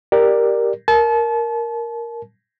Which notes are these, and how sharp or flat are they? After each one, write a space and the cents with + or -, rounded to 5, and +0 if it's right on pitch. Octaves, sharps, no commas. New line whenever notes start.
G4 +0 A#4 +0 D5 +15
A#4 +0 A5 -35